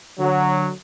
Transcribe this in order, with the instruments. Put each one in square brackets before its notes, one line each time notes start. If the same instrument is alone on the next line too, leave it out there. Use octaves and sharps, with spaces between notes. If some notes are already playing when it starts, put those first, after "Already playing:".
[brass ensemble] D3 F#3